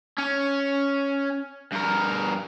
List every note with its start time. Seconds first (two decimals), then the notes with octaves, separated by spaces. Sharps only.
0.18 C#4
1.73 G2 A#4